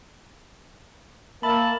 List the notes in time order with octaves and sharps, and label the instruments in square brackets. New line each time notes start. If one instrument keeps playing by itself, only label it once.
[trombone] A#3 [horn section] A#4 E5 A5 [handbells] B5